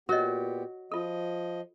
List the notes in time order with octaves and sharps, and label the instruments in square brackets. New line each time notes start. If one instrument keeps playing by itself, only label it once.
[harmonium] A#2 B3 G4 [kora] F#4 [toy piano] A#4 C#5 D#5
[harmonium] F3 D#5 [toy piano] F4 A4